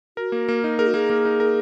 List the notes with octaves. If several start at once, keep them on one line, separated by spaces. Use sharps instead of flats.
F#4 A#4
A#3
A#3
D#4
G#4 A#4
F#4
A#3 G#4
A#3
D#4
A#4